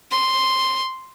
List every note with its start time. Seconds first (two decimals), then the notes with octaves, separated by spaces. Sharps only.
0.11 C6